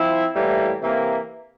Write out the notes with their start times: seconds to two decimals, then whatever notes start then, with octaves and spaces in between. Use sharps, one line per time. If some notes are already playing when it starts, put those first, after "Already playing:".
Already playing: F3 C4 E4
0.35 A2 E3 G3 A#3
0.82 C3 E3 A#3